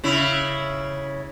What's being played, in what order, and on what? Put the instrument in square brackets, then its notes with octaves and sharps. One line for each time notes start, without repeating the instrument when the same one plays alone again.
[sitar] C#3 E4